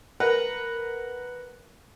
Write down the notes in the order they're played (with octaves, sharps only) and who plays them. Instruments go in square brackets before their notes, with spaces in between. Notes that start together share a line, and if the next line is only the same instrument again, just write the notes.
[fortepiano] A#4 B4 F#5